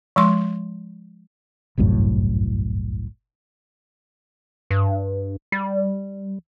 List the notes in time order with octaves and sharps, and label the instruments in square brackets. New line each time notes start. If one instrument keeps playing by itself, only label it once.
[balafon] F3 G#3 C6
[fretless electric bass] G1 C2 F#2 A2
[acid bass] G2
G3